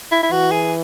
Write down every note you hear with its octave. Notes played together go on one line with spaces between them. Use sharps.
E4
E4
E3 F#4
G#4